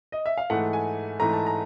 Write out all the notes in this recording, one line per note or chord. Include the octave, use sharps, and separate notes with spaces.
D#5
E5
F5
G#2 E3 A3 F#5
G#5
G#2 E3 A3 A#5
A5
A#5